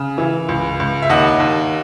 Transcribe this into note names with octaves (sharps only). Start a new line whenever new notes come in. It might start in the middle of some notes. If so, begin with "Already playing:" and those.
Already playing: C#3
E3
C#2
C#2
E5
D#2 D#5 F#5
D#2